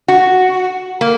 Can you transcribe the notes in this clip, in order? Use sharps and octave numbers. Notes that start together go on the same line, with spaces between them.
F#4
A#3